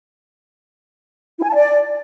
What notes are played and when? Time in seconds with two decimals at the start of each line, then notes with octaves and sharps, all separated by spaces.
1.38 E4
1.44 G#5
1.49 A5
1.55 D5